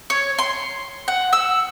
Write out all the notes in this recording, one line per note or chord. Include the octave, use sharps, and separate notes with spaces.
C#5
C6
F#5
E6